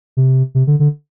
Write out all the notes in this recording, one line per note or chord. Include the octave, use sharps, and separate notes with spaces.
C3
C3
D3
D3